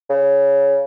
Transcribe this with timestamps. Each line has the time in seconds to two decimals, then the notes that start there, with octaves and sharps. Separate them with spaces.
0.10 C#3